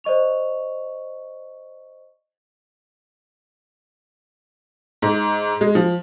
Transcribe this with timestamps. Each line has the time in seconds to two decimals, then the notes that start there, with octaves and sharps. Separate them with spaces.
0.04 C5 D5 D#5 C#6 F7
5.02 G#2
5.61 G#3
5.75 F3